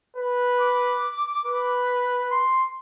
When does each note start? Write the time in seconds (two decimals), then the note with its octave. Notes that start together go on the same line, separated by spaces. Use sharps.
0.17 B4
0.61 D6
1.46 B4
2.32 C6